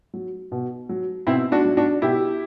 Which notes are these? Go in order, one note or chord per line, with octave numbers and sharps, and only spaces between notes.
F#3
B2
F#3
B2 C4 E4
D4 F#4
F#3
D4 F#4
B2 E4 G4